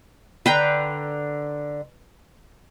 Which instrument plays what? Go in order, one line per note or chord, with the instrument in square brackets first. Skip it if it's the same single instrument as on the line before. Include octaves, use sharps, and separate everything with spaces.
[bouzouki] D3 A#5 [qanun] B4 G5